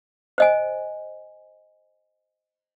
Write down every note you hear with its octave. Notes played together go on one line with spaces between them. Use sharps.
C5 D#5 G#5